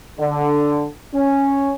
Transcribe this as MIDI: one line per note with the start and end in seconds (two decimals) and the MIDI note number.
0.19 0.86 50
1.14 1.72 61